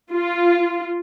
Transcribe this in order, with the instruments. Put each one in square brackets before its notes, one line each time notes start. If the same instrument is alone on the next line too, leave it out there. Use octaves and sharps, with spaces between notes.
[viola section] F4